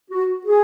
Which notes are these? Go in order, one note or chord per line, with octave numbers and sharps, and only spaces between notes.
F#4
G#4